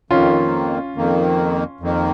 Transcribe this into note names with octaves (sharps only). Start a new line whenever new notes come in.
F2 D#3 A#3 C#4 F4
F2 D#3 A#3
F2 D#3 A#3